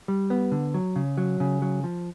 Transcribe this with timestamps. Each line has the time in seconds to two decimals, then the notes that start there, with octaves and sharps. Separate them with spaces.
0.08 G3
0.30 B3
0.52 D3
0.74 F#3
0.96 C#3
1.18 F#3
1.40 C#3
1.62 F#3
1.84 F3